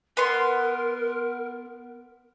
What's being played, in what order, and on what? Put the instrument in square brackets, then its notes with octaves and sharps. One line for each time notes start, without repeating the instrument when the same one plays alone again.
[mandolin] B3 C6 [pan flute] A#4